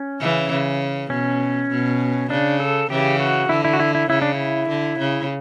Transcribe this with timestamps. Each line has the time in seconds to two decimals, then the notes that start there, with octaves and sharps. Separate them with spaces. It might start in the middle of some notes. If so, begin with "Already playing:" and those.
Already playing: C#4
0.20 C#3 E3
0.51 C#3
1.10 B2 C#4
1.70 B2
2.30 C#3 D4
2.60 A4
2.89 C#3 E3 G4
3.20 F#4
3.49 D3 E4
3.65 E4
3.73 F#4
3.80 E4
3.95 E4
4.09 C#3 E4
4.22 D4
4.34 E4
4.69 D3
4.99 C#3